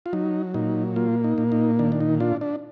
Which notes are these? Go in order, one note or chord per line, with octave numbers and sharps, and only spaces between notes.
F4
F#3 D#4
A#2 D#4
A#3 F4
D#4
A#2
D#4
D#3 D4
D4
D#4
D4 F4
D4